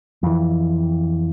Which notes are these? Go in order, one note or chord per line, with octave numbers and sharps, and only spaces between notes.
F2 E3